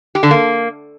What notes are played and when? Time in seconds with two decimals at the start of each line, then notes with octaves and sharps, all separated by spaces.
0.15 G4
0.23 D3
0.31 A#3